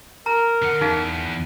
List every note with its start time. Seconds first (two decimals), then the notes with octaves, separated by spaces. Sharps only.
0.26 A#4 A#5
0.62 D3 F#5
0.81 E2 D#4 G#4 F5